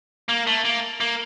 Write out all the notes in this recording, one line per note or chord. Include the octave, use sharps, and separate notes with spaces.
A#3
A3
A#3
A#3